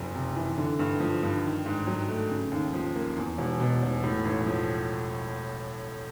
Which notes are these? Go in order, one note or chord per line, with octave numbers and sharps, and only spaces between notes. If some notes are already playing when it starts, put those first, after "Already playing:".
Already playing: F#1 F2
C3
E3
D3
G2
F3
G2
D#3
G#2
F#3
A3
C#3
D#2
F3
A#3
E2
E1
B2
E1
A2
A1
F3